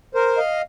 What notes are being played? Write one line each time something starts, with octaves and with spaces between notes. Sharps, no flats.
A#4 C5
D#5 F5